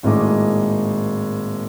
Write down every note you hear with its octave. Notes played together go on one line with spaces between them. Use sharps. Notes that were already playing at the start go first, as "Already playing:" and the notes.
G#1 A2 G#3 A#3 D#5 D6